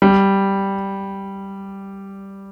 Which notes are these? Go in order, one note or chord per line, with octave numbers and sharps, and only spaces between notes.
G3